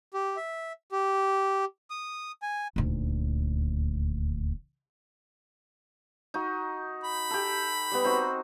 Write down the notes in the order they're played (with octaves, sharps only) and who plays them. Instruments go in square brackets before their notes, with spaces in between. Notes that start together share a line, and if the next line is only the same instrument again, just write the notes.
[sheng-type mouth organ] G4
E5
G4
D#6
G#5
[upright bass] D#1 D2
[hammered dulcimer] D#4 F#4
[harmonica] B5
[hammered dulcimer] G4 A4
G3 B3
C4 D#4 F#4